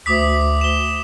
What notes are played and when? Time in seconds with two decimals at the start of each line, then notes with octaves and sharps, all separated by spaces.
0.06 D2 D6 D#6 B6
0.61 E7 G7